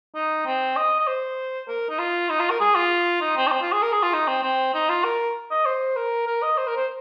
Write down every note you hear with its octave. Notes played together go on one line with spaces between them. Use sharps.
D#4
C4
D#5
D#5
C5
A#4
D#4
F4
D#4
F4
A#4
G#4
F4
D#4
C4
D#4
C4
F4
G#4
A#4
G#4
F4
D#4
C4
C4
D#4
F4
A#4
D#5
C5
A#4
A#4
D#5
C5
A#4
C5